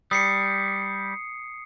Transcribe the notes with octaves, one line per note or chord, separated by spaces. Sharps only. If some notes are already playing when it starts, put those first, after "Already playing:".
G3 D#6 C7 C#7